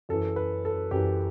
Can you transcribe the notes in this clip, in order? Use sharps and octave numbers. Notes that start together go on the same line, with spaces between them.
F#2 E3 A4
B4
A4
F#2 E3 G4